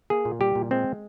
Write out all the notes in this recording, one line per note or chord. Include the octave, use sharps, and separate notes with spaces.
A#3 G#4
A#2
G3 G4
A#2
G#3 C4